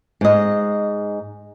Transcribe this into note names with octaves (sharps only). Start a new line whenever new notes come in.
G#2 D#5